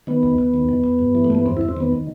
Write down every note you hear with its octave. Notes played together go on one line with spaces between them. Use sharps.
D#3 B3
D#2
D#2
D#3
E2
E2
G2
E3
A3
G2 B3
E2 C4
E2 E4
C4
D#3 B3